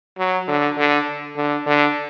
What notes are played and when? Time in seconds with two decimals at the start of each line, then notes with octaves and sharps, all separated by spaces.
0.18 F#3
0.48 D3
0.78 D3
1.36 D3
1.66 D3